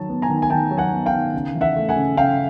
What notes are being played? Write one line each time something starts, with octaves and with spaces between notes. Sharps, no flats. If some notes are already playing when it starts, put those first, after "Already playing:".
Already playing: D#3 F#3 A5
B3
G#5 A#5
D#3
G#5
D#3 G5 A5
F#3
F#5 G#5
B3
F5 G5
D#3
C#3
E3
E5 F#5
A3
F#5 G#5
C#3
C#3 F5 G5